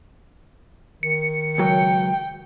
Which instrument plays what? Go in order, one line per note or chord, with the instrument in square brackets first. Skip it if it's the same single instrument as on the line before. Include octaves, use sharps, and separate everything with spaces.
[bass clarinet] D#3 [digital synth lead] C#7
[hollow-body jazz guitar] C#2 F#3 [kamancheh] G5